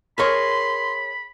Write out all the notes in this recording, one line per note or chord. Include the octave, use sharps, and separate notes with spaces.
G#4 A#4 C#5 B5 C6